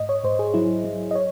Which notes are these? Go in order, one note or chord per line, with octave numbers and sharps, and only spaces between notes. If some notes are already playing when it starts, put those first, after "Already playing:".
Already playing: G#2 D#5
C#5
G#2 C5
G#4
F#3 E4
F#3
D#5
C#5